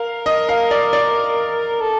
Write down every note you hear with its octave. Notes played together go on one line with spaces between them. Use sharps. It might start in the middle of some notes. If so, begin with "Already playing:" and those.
Already playing: A#4 F5
D#5
F5
D5
D5
A4